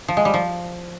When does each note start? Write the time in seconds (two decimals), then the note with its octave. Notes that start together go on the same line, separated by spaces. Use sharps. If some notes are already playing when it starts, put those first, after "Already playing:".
0.08 F3
0.17 G#3
0.25 G3
0.34 F3